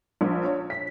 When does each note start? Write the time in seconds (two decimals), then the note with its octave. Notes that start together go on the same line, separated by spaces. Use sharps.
0.21 A#1
0.45 C#5
0.70 B6